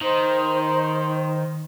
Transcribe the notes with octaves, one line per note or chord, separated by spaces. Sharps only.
D#3 D#4 C5